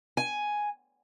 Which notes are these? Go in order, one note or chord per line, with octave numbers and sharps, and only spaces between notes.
G#5